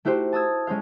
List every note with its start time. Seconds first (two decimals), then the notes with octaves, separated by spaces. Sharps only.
0.05 A3 E4 F#4 G4 C5
0.33 A5 D#6 E6 G#6
0.67 G#3 C#4 C5 F5